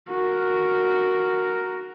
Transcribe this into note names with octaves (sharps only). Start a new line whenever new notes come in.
F#4 A#4